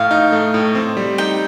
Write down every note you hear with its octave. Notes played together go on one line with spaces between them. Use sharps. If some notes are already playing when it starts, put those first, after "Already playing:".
Already playing: A2 F5
D#4
A3
A2
C4
G3
D#4 G5